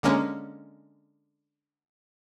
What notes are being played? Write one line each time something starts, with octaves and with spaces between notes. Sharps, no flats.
D3 G#3 A#3 C#4